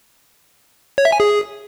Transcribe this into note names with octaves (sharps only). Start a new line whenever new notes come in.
C#5
E5
G#5
G#4